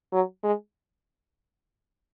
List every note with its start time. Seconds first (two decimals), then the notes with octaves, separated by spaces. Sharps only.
0.12 F#3
0.43 G#3